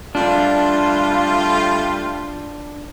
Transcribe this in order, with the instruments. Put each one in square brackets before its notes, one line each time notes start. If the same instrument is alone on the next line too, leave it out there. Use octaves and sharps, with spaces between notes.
[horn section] G3 A3 F4 [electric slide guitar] D4